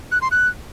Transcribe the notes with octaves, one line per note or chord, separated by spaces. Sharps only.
F#6
C6
F#6